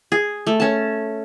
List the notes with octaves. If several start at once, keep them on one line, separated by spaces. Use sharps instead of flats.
G#4
A3
C#4 A5